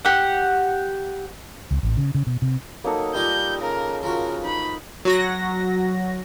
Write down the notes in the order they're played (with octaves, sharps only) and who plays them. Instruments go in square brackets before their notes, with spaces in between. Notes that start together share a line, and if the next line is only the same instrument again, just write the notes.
[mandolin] G4 F#5
[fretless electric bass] C#2
A1
C#3
C#3
B2
C3
[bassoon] F#3 [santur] A#3 D#4 A4
[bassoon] G3 [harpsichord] D#4 F4 D6 [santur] D#5 [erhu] G6
[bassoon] C#3 [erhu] A#4
[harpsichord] F3 F#4 [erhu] A#4
[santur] D#4 [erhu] B5
[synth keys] F#3 F#4 A#6